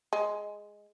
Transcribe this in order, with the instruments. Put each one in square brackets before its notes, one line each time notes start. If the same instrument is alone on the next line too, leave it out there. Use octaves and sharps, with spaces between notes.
[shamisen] G#3